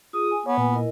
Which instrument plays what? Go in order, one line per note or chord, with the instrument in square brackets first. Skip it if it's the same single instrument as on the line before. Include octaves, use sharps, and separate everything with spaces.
[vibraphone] F4 G#4 [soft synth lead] D#6
[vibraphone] G#5
[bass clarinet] B3 [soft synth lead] C#5
[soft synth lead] A#2 [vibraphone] B4 G#5
[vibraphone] E4 A#4 D#5